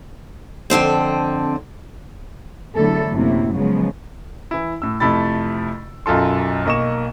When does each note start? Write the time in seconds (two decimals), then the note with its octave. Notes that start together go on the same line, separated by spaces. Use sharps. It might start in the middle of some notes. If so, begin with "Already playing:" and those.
0.70 F2 D3 C4 C5
2.76 E2 D3 F#3 A3 E4 A4
3.12 F#2 A2 C3 A#3 E4
3.54 C#3 F3 F#3 G#3 B3
4.51 E3 E4
4.82 A2 E6
5.00 F2 C3 A3 E4 B5 A6
6.06 B1 F#2 F4 A4 C6
6.65 B1 A#3 D#5 C#6 E7